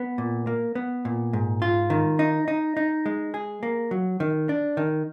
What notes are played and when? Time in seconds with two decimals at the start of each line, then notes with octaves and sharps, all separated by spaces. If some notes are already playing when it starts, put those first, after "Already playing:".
Already playing: B3
0.18 A#2
0.47 A#3
0.75 B3
1.05 A#2
1.33 G#2
1.62 F4
1.90 D#3
2.19 D#4
2.48 D#4
2.77 D#4
3.06 G#3
3.34 G#4
3.63 A#3
3.91 F#3
4.20 D#3
4.49 D4
4.77 D#3